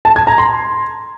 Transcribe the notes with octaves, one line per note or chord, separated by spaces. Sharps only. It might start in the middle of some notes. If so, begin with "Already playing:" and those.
A5
G#6
A#5
C6